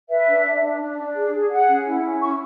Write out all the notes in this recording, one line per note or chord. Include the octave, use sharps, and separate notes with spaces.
B4 E5
D4
D4
D4
D4
D4
G#4
G#4
G#4 F#5
C#4
E4
C#4
E4 C#6